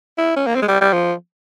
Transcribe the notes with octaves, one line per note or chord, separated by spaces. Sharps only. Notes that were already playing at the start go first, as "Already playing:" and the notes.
E4
C#4
A#3
C4
G#3
G3
G3
F3